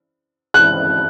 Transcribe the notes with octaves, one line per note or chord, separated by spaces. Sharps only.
F#6